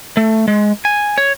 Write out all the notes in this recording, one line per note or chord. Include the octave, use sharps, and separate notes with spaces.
A3
G#3
G#5
C#5